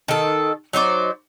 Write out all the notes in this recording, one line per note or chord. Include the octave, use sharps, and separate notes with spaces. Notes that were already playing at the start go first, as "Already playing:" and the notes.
D#3 A4
F#3 D#4 C5 D5